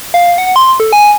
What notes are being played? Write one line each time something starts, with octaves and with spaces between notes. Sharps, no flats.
F5
F#5
C6
A4
G#5